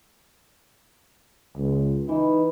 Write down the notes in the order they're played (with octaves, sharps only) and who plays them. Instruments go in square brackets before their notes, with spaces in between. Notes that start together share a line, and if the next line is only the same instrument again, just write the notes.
[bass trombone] C#2
[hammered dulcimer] E3 [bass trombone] D#4